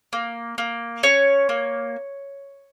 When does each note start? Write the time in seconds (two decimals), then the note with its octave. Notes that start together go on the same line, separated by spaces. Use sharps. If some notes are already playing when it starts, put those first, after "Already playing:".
0.13 A#3
0.58 A#3
1.03 C#4 C#5
1.49 A#3